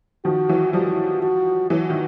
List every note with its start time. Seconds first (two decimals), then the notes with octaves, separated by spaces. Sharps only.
0.25 D#3 F3 F#4
0.49 E3 F#3
0.73 F3 G3 F#4
1.22 F#4
1.70 E3 F#3 F#4
1.90 D#3